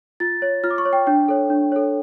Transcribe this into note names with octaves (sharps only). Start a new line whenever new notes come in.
F4 A6
C#5
F4 F6
D6
C#6
C#5
G5
D4 G5
A4 C#5
D4
A4 C#5